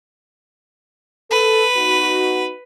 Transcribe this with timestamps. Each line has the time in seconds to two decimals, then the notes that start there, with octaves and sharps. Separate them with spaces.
1.31 A4 B4
1.77 B3 D#4 F#4